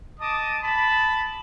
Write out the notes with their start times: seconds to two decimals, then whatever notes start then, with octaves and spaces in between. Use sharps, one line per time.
0.20 D#5 A5 D6 D#6
0.63 A5 B5